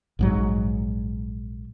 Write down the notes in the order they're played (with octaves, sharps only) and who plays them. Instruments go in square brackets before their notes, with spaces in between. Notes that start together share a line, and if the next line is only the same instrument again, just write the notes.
[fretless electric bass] A#1 G#2 F#3